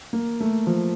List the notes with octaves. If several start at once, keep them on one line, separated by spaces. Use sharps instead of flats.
A#3
A3
F3